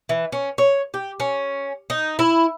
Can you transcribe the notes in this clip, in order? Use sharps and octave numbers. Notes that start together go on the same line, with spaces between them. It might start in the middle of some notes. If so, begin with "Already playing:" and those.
E3
C#4
C#5
G4
C#4
D#4
E4